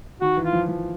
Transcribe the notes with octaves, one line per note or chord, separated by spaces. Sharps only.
D#3 F#4
E3
F4
F3
F3